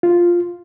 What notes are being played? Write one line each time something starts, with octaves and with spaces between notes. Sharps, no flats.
F4